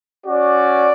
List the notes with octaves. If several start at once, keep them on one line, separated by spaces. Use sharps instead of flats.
C#4 F#4 D5